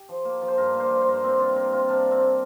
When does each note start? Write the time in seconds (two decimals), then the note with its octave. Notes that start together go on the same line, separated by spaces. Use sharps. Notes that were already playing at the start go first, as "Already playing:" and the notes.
Already playing: G4
0.09 F3
0.25 A#3
0.41 F3
0.48 C5
0.58 G2 A#4
0.74 A#3
0.80 C5
0.90 F3
1.02 C5
1.07 G2 A#4
1.16 C5
1.23 A#3 C4
1.40 C3 F4
1.56 C3 A#4
1.73 C3 F4
1.89 C3 D4
2.05 C3
2.11 C4
2.22 A#3